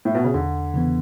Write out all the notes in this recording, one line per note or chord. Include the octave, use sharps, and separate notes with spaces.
A2
B2
C#3
E2 D3
C#3 E3 B3